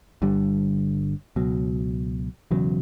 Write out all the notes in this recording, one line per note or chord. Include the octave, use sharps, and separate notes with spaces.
G1 G2 D3 G3
C#2 B2 F#3
E1 E2 C#3 F#3